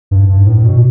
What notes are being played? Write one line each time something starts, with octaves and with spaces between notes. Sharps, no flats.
G2
G2
A2
A2
B2